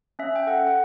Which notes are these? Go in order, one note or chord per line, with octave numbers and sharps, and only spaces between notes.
C#4 E5
G5
A4 F#5
F#5